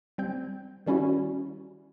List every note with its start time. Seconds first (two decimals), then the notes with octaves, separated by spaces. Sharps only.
0.18 G3 C4 G6
0.86 D#3 G3 C#4 E4 F#4